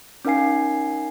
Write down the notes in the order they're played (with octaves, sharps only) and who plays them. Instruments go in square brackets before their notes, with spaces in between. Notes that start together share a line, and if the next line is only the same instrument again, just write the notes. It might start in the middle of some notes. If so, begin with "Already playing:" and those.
[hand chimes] C#4 D#4 A#4 F5 G#5 C7